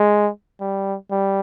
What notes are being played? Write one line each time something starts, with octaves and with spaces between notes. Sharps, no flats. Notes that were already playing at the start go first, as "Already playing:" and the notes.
Already playing: G#3
G3
G3